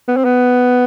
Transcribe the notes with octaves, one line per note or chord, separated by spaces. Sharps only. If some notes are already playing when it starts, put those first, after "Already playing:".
B3
C4
B3